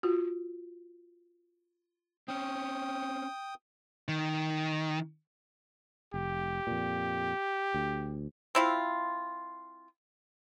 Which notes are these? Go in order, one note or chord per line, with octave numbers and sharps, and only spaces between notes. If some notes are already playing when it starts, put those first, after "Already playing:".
F4 F#4
C4 C#4 G5 D#6
D#3
F1 G4
F2 A#2
D2
C4 E4 F4